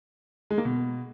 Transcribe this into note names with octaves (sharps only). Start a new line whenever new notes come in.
G#3
A#3
B2